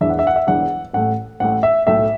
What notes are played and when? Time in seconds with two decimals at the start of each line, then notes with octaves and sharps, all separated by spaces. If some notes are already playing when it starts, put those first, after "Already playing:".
0.01 E1 E2 E3 D4 E5
0.10 F#5
0.19 E5
0.27 F#5
0.36 E5
0.47 E1 E2 E3 D4 F#5
0.93 A1 A2 A3 F#5
1.40 A1 A2 A3 F#5
1.63 E5
1.87 B1 A2 A3 E5